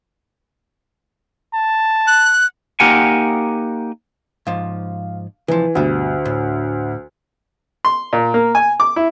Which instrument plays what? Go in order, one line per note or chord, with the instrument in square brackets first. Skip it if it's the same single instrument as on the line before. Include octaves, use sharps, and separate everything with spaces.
[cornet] A5
[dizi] F#6
[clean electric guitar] A#3 D#4 G4 A#4 F#5 G#5
[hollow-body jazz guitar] G#2 F3 [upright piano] F5
[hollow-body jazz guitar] C2 F3 [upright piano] E3
[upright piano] D2 [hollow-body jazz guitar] G2 B2
[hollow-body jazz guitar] A2
[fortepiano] C6
A#2
A#3
G#5
D6
E4